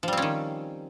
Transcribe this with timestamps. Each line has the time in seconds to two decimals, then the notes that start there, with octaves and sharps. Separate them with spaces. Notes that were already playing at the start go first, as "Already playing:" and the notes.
0.03 F3
0.08 G3
0.13 C4
0.17 C#4
0.22 D#3